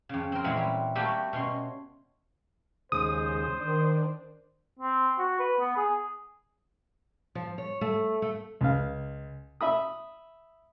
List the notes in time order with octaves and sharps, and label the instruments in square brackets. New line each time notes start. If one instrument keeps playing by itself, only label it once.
[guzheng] F2 C#3
C4 A#4
A#2 E3 F#3 G#3
G3
G3 A3 A#3 F#4 G4 A4
B2 C#4 C6
[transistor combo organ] D#2 C#3 G#3 [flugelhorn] C5 [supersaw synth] D#6
[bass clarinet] D#3 [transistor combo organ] D4
[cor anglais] C4
F#4
B4
B3
G#4
[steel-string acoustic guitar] F3
C#5
A3
A3
[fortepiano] C#2 F5
E5 B5 D#6